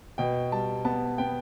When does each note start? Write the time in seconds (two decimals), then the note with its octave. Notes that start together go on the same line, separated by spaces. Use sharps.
0.18 B2 G5
0.52 G3 A5
0.85 B3 A5
1.18 B3 G5